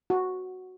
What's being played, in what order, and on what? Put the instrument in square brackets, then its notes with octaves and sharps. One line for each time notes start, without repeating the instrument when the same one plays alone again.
[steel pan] F#4